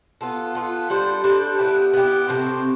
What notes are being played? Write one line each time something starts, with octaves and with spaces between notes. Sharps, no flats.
B3 F4 A4
B3 F4 A4
G3 D4 A4 C5
G3 D4 A4 C5
B3 E4 G4
B3 E4 G4
C3 E3 A3 C4